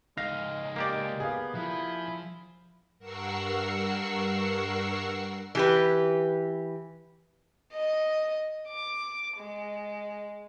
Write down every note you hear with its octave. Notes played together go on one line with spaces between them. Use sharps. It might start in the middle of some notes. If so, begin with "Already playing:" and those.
C#2 G#3 D#4 F5 A#6
A#3 G4 D5
B3 G#4 F5
F3 E4
G2 A#4 F#5 C#6 E6 C7
E3 G4 B4
D#5
D6
G#3